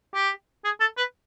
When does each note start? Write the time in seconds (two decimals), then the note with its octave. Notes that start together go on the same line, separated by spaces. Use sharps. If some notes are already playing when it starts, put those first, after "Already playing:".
0.15 G4
0.65 G#4
0.81 A4
0.98 B4